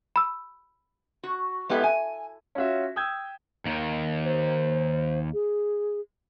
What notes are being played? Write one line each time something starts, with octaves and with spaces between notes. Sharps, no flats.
B5 E6
F#4
G#3 B3 E4 G4 A4
G#5
C#4 F4 F#4 E5
G5 D#6 E6 G6 G#6
D#2 D#3
C5
G#4